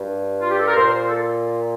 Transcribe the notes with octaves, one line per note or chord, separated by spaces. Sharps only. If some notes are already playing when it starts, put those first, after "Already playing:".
Already playing: G2
F4
G4
A4
A#4
A#2 C5
C5
A4